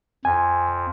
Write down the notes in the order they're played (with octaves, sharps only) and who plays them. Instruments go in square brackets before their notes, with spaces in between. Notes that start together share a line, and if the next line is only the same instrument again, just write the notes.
[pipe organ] F2 [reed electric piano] G#5